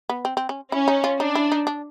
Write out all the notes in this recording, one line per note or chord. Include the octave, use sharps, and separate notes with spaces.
B3
C4
C4
C#4
C#4 E4
D#4
F4
D4 D#4
E4
D#4
D4